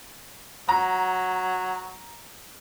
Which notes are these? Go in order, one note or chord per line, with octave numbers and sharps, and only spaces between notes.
F#3 A#5